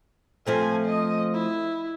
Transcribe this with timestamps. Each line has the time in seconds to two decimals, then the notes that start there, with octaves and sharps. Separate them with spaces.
0.47 F3 A3 C4 G#5
0.85 D#5
1.34 E4